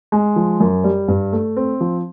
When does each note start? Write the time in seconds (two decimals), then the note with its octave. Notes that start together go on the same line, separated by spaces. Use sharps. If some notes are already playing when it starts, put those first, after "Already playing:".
0.12 G#3
0.36 F3
0.60 F#2
0.84 G3
1.08 G2
1.32 A3
1.57 C4
1.81 F3